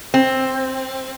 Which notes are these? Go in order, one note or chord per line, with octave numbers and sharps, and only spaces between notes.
C4